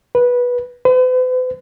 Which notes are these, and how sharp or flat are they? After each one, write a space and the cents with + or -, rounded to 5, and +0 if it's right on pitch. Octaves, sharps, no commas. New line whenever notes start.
B4 -15
B4 +45